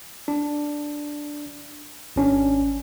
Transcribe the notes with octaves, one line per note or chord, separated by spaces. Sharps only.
D4
G#1 C#4 D4